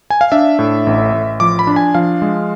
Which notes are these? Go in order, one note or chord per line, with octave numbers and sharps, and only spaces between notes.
G#5
F5
D4 E5
A2
A1
A1
F3 D6
B5
D4
G#5
F3 F5
G#3